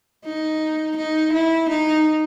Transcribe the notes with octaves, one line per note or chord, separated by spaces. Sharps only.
D#4
D#4
E4
D#4